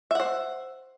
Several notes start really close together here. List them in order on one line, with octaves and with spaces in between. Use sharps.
E5 F#5 C5